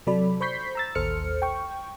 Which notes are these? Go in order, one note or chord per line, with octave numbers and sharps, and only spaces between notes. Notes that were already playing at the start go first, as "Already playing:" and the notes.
C3 F#3 A4 D5 B5
C5 B5 C#6 G6 B6 C7
A#5 E6 A6
A1 D#2 A4 C5 F6 C#7
G5 C#6